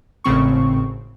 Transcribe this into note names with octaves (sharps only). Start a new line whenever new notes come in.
G#1 A2 C#3 C4 C#6